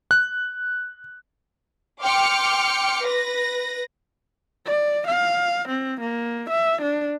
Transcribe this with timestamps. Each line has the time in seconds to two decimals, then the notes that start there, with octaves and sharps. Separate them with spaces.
0.11 F#6
2.03 G5 C6 D6 F6 C#7
3.04 B4 A#6
4.66 D5
5.07 F5
5.68 C4
6.00 A#3
6.49 E5
6.82 D4